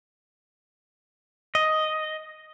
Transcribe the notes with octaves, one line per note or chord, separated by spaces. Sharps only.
D#5